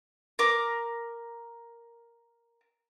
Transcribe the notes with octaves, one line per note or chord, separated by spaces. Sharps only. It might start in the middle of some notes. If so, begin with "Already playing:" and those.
A#4 D6